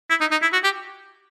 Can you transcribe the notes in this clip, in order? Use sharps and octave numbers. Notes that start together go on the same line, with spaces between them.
E4
D#4
D#4
E4
F#4
G4